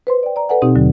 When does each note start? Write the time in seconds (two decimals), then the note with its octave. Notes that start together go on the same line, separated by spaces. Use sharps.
0.07 B4 C5 C6
0.23 D5 G5
0.36 D5 A#5
0.49 A4 B4 D5 F#5 G#5
0.62 B2 C4 D#4 G4
0.75 D#2 D3 F#3